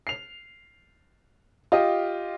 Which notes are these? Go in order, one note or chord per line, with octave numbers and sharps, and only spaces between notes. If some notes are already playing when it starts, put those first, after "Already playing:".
C7 F7
F4 G4 D#5